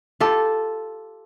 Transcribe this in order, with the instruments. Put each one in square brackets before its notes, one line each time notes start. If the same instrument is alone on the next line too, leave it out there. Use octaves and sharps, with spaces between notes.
[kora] F4 G4 A4